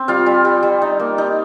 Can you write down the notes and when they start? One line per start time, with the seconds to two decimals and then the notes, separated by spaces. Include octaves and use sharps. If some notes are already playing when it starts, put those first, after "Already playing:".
Already playing: C4
0.08 G3 F4 F5
0.26 G3
0.45 G3
0.63 G3
0.82 D#4
1.00 A#3
1.18 D#4